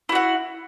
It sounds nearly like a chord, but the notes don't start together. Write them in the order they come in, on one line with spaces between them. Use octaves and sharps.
E4 F#4 F#5